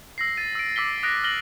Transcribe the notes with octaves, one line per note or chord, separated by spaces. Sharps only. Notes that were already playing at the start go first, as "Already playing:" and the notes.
E6 A#6 C7
A6 D#7
E6 D7
D6 E6 B6 G7
D#6 F#6 A#6 D7
F6 A#6 F#7 G7